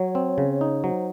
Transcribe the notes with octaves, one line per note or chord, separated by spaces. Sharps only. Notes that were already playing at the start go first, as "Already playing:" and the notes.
Already playing: F#3 C#5
C4
C#3
D#4
F#3 C5